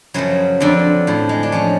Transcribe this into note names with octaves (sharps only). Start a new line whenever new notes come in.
F#2 C#3 F3 F#3
F2 D3 F3
A2 F3
G#3
D4
A2 F3 C#4